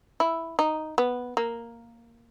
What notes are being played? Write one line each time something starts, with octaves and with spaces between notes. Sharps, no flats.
E4
D#4
B3
A#3